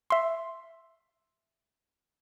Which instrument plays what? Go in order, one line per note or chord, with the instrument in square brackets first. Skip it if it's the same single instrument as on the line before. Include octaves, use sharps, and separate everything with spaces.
[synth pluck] E5 C6